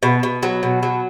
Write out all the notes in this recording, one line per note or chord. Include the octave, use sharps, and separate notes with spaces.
B2
B2
F#3
B2
F#3